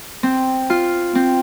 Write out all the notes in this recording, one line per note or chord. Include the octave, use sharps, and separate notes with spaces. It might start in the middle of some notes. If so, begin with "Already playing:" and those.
C4
F4
C4